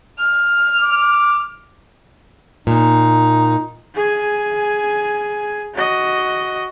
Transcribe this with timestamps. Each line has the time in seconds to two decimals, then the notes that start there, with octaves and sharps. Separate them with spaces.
0.19 F6
0.79 D6
2.67 A#2 D#4
3.95 G#4 G#5
5.75 F#4 D#5